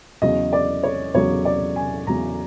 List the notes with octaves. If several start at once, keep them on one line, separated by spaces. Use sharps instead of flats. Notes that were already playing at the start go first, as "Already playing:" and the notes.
E2 C#3 F#3 D#5
D5
C#5
E2 C#3 F#3 C#5
D5
G#5
E2 C#3 F#3 A#5